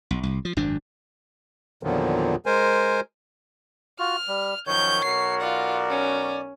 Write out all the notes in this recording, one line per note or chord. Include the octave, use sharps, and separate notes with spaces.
B1
C2
F3
G#1 F#2 D4
E2 A#2 D3 D#3 F3 F#3
G#3 A#4 C5 G#5
F4 F#4 F6
G3
F#2 D#3 F3 C#5 G6
B1 F#4 A#4 C7
F4 D5 F#5
C#4